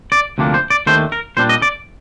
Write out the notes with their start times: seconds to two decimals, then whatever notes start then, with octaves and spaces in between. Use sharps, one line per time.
0.12 D5
0.38 D2 C3 F3 A#3 D4
0.54 C5
0.70 D5
0.86 D#2 D#3 A3 D4 C5
1.12 A#4
1.37 A#2 G3 D4 C5
1.49 D#5
1.62 D5